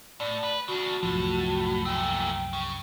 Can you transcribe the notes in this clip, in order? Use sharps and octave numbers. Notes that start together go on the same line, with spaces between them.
A2 D5
B4
C#3 D4 F#4
C2 F#2 A2 F3
A#2 A3 G5
C#3